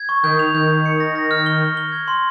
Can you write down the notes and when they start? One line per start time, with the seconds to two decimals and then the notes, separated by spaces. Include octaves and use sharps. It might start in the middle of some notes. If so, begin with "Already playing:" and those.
Already playing: G#6
0.09 C#6
0.23 D#3 G6
0.39 F7
0.54 D#3 G6
0.70 G6
0.86 C#7
1.00 A#6
1.15 A#6
1.31 F6
1.46 G7
1.62 G7
1.77 G7
1.92 G#6
2.08 C6